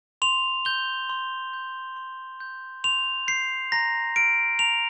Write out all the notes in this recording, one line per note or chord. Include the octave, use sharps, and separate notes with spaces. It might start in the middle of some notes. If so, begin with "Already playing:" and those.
C6 F7
G6 G7
C6
G6
C6
G6
C6 F7
G6 C7
A#5 A#6
F6 D7
A#5 F7